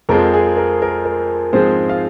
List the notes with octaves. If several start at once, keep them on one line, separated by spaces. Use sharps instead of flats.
F2 F3 G#3 C4 A#4 A#5
G#4 G#5
A#4
A#4
A#4
G#2 F3 G#3 C4 C5
F4 F5